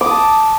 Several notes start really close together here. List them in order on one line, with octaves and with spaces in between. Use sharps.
D6 D#6 A5